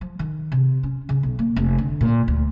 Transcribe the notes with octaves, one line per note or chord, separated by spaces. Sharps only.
F3
D#3
C3
C#4
C#3
B1
A#3
F1
D3
A#2
D2